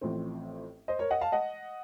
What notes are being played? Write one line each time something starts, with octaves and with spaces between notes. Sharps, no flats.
A1 A2 F3 C4
C5 D#5
A#4 C#5
D#5 F#5
F5 A5
D#5 F#5